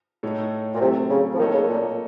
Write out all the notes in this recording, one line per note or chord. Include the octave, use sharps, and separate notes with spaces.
A2 A3 D#4 A4 C#5
A#2
C3 F#3 A3 C4
C#3
F3
D#3 A#3 D#4 A4 C#5
C#3
A#2